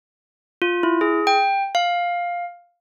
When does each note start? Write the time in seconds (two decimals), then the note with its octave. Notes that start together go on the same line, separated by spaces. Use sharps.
0.62 F4
0.83 E4
1.01 G#4
1.27 G5
1.75 F5